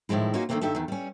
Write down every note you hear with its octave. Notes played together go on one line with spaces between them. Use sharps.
A2 D#3 F3 G#3 E4
A#3 C#4 D#4 F4 F#4 G#4
D3 D#3 G3 A3 A#3 C4
G2 D#3 G4 A4 E5
E2 D#3
G3 C#4